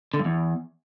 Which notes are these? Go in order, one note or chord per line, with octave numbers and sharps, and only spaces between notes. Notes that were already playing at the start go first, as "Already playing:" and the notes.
D3
G2
E2